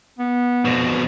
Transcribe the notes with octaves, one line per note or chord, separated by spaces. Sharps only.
B3
F2 B2